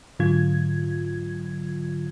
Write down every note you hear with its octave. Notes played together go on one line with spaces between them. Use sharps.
G#2 D3 F#3 F4 G#6